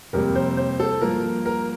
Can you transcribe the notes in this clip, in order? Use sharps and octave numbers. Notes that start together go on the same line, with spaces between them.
F2 C3 G3 A#3 A#4
C5
C5
A4
G2 F3 A#3 A#4
A#4